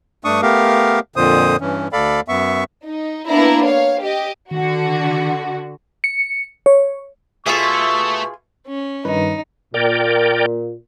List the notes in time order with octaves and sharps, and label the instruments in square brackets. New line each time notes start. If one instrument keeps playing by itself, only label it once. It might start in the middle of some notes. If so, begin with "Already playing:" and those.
[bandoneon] G2 A3 D4 C#6 D#6
A3 B3 G4 A#4 F5
F2 A#2 D3 C5 D#6
G2 E3 C#4
D2 A4 D5 F5 B5
F#2 B3 E5 C#6
[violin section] D#4
A#3 B3 D4 E4 A#5
C#5 F5
G4 D#5
[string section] D3 F#4 [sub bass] D#3
[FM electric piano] C#7
C#5
[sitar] B2 B3 E5 [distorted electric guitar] A3 [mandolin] F4 G#4 [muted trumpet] C#6
[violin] C#4
[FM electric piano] G2 D#3 B4 [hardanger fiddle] D#4
[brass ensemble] A#2 [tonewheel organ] A#4 D5 G5